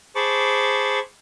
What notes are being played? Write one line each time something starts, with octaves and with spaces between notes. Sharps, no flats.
G#4 C5 A5 B5 C#6 D6